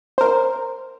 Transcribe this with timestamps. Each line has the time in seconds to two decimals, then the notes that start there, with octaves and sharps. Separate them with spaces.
0.18 A#4 C5